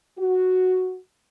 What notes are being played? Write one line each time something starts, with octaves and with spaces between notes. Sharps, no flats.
F#4